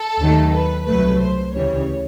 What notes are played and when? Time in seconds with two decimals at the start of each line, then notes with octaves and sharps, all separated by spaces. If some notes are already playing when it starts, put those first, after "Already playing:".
Already playing: A4
0.19 D#2 D#3 F#3 A3
0.53 B4
0.86 C2 B2 F#3 A3 B4
1.20 C5
1.54 D2 C#3 E3 G3 C#5